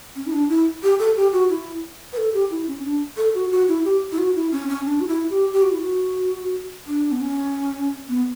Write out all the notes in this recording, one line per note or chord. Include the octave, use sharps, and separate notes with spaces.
C#4
E4
D4
E4
G4
A4
G4
F#4
E4
B4
A4
G4
E4
C#4
D4
A4
F#4
F#4
E4
G4
E4
F#4
E4
C#4
C#4
D4
F#4
E4
G4
G4
F#4
E4
F#4
D4
B3
C#4
B3